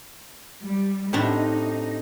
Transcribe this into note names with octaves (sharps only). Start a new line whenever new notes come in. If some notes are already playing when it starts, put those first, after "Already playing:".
G3
A2 C3 D4 D#4